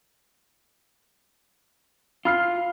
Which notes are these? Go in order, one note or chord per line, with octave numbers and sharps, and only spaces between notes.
F4 B5 F6 C7